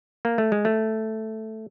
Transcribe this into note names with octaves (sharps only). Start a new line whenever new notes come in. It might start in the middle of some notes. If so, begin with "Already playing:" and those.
A#3
A3
G#3
A3